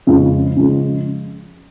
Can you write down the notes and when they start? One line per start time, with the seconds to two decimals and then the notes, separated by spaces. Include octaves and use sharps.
0.07 F2 C#3 G#3 F4
0.57 C#3 F3 G#3